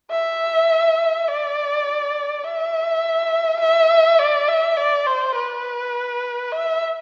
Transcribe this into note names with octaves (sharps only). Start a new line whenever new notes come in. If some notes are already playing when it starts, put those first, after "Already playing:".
E5
D5
E5
E5
D5
E5
D5
C5
B4
E5